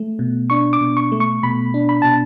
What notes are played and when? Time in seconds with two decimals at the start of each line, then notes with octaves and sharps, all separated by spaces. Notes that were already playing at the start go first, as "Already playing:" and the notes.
Already playing: A3
0.19 B2
0.50 D4 C#6
0.73 D6
0.81 B2
0.97 C#6
1.12 A3
1.20 C#6
1.43 B2 B5
1.74 D4
1.89 B5
2.02 B2 A5